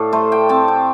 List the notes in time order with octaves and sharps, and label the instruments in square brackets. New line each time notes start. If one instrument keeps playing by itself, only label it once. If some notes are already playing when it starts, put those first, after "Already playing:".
Already playing: [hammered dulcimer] A2 A4 D5 F5
A3 C5
G5
C4 A5
G5